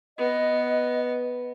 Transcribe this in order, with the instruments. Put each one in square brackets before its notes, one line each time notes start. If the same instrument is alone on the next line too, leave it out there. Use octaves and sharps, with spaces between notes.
[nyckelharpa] B3 [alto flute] D#5